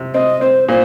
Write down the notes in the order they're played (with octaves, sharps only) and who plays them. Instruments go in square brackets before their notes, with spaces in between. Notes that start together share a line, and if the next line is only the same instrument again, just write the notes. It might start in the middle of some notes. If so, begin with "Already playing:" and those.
Already playing: [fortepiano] C3
[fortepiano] C4 [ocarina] D#5
[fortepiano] C4 [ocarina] C5
[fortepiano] A#2 [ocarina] C5